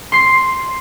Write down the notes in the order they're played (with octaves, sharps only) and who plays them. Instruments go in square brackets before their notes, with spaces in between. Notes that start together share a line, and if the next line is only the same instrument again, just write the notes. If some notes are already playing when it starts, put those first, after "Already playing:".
[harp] C6 C7